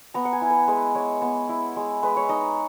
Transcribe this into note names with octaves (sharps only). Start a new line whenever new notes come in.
B3 A#5
F#5
G#5
E4
B4
G#3 B4
G#3 C#5
B3
E4
G#3
G#3 B4
C#5
D#4 D#5